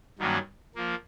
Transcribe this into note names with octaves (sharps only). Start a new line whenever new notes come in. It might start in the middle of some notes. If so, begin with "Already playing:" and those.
G2 D#3 F#3 A#3 C#4
F3 A#3